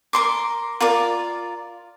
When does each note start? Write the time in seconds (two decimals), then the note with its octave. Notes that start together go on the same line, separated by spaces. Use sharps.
0.13 A#4 C6 D6
0.80 F4 A#4 D5